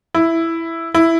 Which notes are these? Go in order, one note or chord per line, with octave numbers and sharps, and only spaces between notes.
E4
E4